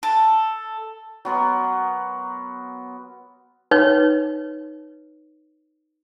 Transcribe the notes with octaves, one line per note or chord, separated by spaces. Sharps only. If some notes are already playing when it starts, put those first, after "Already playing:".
A4
F#3 B3 A#4 C6
D#4 B4 C#5